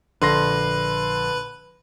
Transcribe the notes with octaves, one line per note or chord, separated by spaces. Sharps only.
A#1 D3 B4 C6 A#6